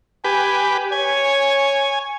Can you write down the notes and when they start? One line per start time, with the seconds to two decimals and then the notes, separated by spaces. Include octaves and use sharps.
0.24 G4 B4 G#5
0.92 C#5 G#5